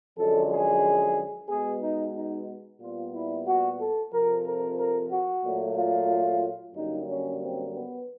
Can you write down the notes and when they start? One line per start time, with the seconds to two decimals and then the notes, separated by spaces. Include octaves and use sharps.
0.18 F#2 D3 F3 G#3 A4
0.50 G#4
1.49 B2 G#3 B3 G#4
1.82 D#4
2.15 D#4
2.80 A#2 G3 B3 F4
3.13 E4
3.46 F#4
3.79 A4
4.12 F2 C3 F3 A#4
4.45 A#4
4.77 A#4
5.10 F#4
5.44 A#2 F#3 A3
5.76 F4
6.75 F#2 D3 G3 A#3 D#4
7.08 C#4
7.41 C4
7.73 B3